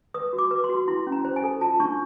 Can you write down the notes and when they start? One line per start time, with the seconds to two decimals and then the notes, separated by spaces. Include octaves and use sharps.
0.14 B4 D#6
0.33 F#4
0.38 D6
0.51 B4
0.64 C6
0.69 F#4
0.88 E4 C6
1.07 C#4
1.12 A#5
1.25 C5
1.36 G#5
1.44 A4
1.61 F4 A5
1.80 D4 C#6